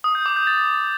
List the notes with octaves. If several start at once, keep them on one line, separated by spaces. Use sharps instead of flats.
D#6
G6
D6
G6
A6